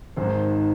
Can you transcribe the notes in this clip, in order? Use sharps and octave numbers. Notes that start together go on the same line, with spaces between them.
G#1 G#2 D#3 C5